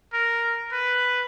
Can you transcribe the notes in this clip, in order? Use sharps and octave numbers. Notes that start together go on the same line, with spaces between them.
A#4
B4